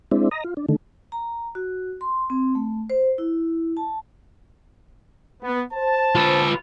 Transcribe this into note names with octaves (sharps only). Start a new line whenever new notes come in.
G#3 C4 D4 E4
D#5 A#5
F4
D4
D3 D#3 A3
A#5
F#4
C6
C4
A3
C5
E4
A5
B3
C5 A5
F4 B4